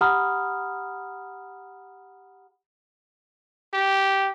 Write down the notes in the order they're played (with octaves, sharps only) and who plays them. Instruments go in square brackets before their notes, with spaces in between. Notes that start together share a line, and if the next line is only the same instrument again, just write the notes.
[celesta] G4 F#5 A#5 B5 D#6 F6
[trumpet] G4